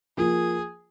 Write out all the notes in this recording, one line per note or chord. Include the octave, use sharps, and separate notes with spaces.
F3 A#3 F4 G#4